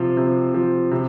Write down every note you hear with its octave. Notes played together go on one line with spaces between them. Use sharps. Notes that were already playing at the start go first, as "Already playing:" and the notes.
Already playing: C3 F3
C3
F3
C3